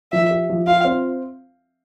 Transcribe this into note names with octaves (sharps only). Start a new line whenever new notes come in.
F3 E5
G4
F3
F4 F5
C4